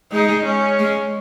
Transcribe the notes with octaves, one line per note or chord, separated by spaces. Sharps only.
G#3 D#4
C#4
G#3